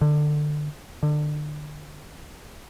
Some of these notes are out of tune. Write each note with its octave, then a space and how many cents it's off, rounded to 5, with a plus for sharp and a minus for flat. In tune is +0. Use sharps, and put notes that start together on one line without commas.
D3 +25
D3 +30